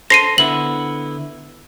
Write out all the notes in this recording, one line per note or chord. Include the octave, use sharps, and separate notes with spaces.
A4 C5 A#6 C7 D#7
D3 B3 E4 F#7